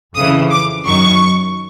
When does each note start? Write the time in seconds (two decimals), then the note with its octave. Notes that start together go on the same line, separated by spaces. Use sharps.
0.15 F2 C#3 E3 D#6
0.51 D6
0.86 F#2 D#3 F#3 C#6